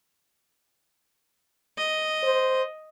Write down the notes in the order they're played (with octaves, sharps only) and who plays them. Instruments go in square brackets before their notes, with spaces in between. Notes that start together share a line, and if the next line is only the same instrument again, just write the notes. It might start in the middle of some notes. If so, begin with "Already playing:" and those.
[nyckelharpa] D#5
[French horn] C5